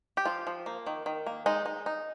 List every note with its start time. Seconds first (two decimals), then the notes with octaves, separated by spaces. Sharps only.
0.17 G4
0.25 F3 F4
0.47 F3
0.66 A#3
0.87 D#3
1.06 D#3
1.26 A#3
1.46 G#3 D#4
1.66 D#4
1.86 D#4